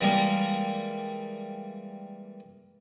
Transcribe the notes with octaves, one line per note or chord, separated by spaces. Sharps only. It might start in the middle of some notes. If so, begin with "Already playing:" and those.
E3 G3 G#3 A#3